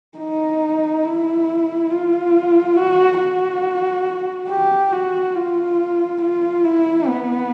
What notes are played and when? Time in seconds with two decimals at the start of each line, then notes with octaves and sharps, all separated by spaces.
0.18 D#4
1.05 E4
1.91 F4
2.77 F#4
3.20 F#4
4.49 G4
4.92 F#4
5.35 F4
6.21 F4
6.64 E4
7.07 B3